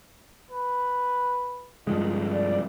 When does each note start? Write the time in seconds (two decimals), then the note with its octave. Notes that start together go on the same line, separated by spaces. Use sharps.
0.51 B4
1.87 G2 F3 G#3 D#4
2.31 D5